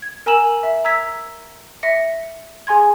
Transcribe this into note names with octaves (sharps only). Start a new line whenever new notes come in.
G#6
A#4 G#5 A#5 E6 E7 F#7
E5
A#5 E6 G#6 B6
E5 A#6 C#7
G#4 G#5 C6 G#6